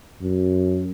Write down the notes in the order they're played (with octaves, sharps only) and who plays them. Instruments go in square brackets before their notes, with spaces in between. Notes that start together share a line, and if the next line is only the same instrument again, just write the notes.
[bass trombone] F#2